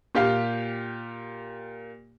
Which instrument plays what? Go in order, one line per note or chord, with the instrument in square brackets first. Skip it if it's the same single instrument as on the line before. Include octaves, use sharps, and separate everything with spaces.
[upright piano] A#2 G4 F5